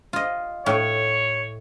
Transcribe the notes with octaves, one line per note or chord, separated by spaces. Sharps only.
F4 D#5
A2 C#5